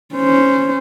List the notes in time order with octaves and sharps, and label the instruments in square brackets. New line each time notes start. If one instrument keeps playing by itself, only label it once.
[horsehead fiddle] C#4 C5